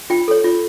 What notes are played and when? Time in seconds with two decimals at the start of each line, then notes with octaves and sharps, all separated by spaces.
0.10 F4 G5
0.28 A4 C#5
0.44 F4